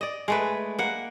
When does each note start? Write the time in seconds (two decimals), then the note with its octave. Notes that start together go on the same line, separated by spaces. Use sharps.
0.01 D5 D#5
0.28 G#3 A3 B4
0.79 A#3 F#5